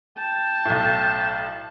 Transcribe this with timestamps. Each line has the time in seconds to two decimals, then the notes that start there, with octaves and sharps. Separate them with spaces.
0.18 G5 A5
0.65 B1 A2